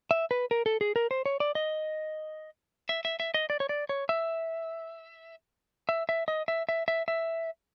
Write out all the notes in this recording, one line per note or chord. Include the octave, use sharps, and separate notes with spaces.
E5
B4
A#4
A4
G#4
A#4
C5
C#5
D5
D#5
E5
E5
E5
D#5
D5
C#5
D5
C#5
E5
E5
E5
D#5
E5
E5
E5
E5